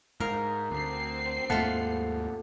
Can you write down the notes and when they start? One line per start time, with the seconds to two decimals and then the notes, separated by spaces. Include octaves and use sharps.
0.20 G#2 A#4 F5
0.71 D2 C4 C7
1.50 D#2 G#2 A3 A#3 F4 F#5 A5